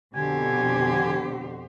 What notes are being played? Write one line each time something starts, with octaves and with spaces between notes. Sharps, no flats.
F2 B2 D3 G4 C5 G#5